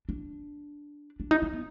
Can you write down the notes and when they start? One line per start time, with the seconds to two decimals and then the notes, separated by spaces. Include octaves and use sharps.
0.09 D4
1.20 D4
1.31 D#4
1.42 D4
1.53 B3